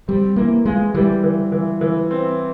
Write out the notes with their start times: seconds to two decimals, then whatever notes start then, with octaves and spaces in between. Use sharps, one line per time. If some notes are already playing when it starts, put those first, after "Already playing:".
0.08 G3 C4
0.36 E3 A#3
0.65 G#3 F4
0.94 E3 G3
1.24 E3
1.52 E3
1.81 E3
2.11 C4